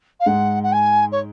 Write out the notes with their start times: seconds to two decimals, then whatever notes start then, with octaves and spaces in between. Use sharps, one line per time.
0.20 F5
0.26 G#2 G#3 F#5
0.63 F#5
0.72 G#5
1.12 C#5